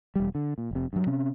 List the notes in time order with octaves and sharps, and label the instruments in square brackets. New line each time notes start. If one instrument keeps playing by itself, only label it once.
[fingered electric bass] E1 G3
D3
A#2
F1 C3
G2 F#3
C3 C#4